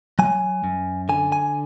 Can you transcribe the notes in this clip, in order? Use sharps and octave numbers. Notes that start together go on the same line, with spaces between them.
F#3 G#5
F#2
D3 G#5
G#5